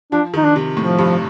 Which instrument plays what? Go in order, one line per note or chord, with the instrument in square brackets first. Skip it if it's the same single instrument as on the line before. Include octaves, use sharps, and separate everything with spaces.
[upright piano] F3 [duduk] D4
[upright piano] D#3
[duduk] D#4
D4
[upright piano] C3
[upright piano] A2 [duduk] F3
[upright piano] G2